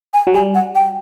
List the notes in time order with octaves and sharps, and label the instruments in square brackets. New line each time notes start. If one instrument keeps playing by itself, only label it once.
[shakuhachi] G#5
[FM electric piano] F#3
[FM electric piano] G3 [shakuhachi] G#5
[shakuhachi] F#5
G5